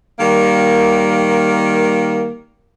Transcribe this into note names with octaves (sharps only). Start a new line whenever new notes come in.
D#3 G3 A#3